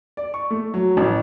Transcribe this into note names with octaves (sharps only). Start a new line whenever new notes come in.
D5
C#6
A3
F#3
A1